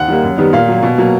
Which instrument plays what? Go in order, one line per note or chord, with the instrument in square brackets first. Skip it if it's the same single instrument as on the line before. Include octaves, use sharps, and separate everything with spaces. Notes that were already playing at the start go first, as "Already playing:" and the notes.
Already playing: [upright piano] D#2 F#5
D#3 G3 A#3
F#2
D#3 G3 B3
A#2 F5
F#3 A#3
B2
F#3 A#3